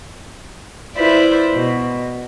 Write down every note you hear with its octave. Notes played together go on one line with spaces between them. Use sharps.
E4 F4 B4 C5 D5 E5
B2